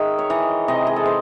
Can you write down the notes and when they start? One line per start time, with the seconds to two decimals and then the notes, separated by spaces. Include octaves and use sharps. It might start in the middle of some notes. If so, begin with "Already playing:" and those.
Already playing: D#3 G#3 E5
0.19 C#5
0.30 E3 D#5
0.68 C3 D#5
0.87 G#4
0.96 A4
1.06 C5